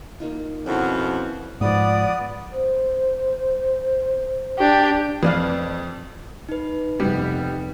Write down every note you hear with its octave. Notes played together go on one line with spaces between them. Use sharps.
A#3 D#4 F4
F2 B2 C#4 E4 F5
G#2 F3 B3 D5 D#6
C5
D4 G4
F2 B4 D5 F5
D#4 B4
F1 G3 B3